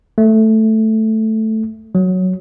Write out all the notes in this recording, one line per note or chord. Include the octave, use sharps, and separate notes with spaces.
A3
F#3